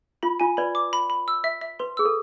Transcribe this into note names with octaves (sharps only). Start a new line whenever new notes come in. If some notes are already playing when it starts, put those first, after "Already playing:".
F4 B5
F4 G#5
B4 D5 B5
D6
B5
B5
E6
E5
E5
B4 C6
G#4 E6
A4